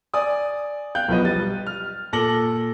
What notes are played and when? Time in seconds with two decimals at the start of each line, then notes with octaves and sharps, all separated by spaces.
0.14 D5 G#5 D#6
0.95 F5 G5 F#6 G6
1.08 B1 F3 B3 D#5
1.24 G3 A6 D#7
1.67 F6
2.13 A#2 A4 D6 A#6 F#7 G7